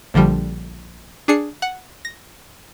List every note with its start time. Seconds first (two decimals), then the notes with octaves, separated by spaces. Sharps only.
0.14 A#1 D3 F3 G3
1.28 D4 G#4 C7 C#7
1.62 F#5
2.05 A#6